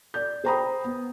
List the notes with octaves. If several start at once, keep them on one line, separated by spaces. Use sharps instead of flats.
D5 G6
G#4 C5 G5 A#5 B5 D#6
B3